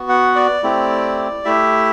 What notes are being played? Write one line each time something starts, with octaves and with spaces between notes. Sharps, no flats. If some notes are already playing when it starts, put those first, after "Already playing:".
Already playing: B3 F#4
F#5
D5
A3 C4 E4 G4
A3 E4 G4 E5